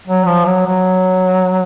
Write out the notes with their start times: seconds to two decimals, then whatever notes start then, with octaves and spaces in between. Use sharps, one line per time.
0.07 F#3
0.27 F3
0.46 F#3
0.66 F#3